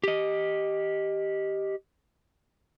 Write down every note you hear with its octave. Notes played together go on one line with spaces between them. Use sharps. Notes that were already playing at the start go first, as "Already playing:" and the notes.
G4 D#5